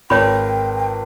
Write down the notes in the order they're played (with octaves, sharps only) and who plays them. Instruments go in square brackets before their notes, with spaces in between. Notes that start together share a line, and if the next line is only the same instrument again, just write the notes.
[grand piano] G#1 [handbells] F4 A#4 B4 [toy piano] C#5 B5 [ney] G5